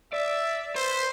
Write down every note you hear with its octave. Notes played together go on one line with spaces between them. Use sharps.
D5 E5
B4 C5